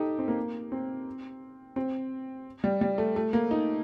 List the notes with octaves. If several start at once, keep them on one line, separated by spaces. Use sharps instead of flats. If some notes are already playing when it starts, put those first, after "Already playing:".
Already playing: D#4 G4 A4
C4
A#3
C4
C4
G3
G3
A3
A3
A#3
D#4